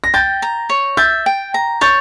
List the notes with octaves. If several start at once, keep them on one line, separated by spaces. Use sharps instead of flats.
A#6
G5 G6 A6
A#5
C#5
E5 G6 A6
G5
A#5
C#5 G6 A6